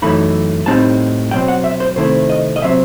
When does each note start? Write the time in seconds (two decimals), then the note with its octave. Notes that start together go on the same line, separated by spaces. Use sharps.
0.02 F#2 E3 A3 D#4 B5
0.66 A2 G3 C4 D#4 A5
1.31 B2 F#3 C4 G5
1.48 F#5
1.64 E5
1.80 C5
1.96 C3 D#3 A3 C4 E4 C5
2.30 D#5
2.56 D#5
2.62 C3 F#3 C4 E5